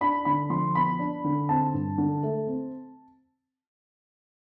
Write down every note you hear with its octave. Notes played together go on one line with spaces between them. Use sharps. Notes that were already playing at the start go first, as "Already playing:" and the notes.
D4 B5
D3 B5
F3 C6
B3 B5
D4
D3
C4 A5
G2
D3
A3
C4